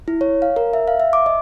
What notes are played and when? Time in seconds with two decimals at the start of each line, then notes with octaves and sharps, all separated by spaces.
0.08 E4
0.21 C#5
0.42 F5
0.56 A#4
0.73 E5
0.88 F5
1.00 E5
1.13 D6
1.26 D#5